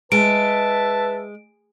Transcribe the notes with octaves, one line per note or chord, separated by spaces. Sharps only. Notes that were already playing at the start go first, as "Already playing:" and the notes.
G#3 B4 E5 A5 D7